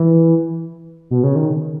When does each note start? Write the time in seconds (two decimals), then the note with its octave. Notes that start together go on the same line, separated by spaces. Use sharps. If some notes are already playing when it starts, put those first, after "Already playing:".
Already playing: E3
1.11 B2
1.23 C#3
1.36 D#3